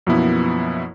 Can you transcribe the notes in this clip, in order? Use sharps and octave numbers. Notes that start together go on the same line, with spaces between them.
F#2 B2 F3 A#3 B3 E4